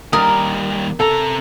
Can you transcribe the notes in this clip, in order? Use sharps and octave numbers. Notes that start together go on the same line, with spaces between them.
D#2 G3 A#4 D#6
C3 A4 A#5